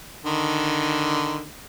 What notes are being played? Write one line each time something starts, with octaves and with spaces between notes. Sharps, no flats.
D3 D#3